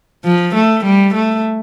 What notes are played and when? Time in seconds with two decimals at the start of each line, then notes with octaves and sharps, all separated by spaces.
0.25 F3
0.55 A3
0.84 G3
1.14 A3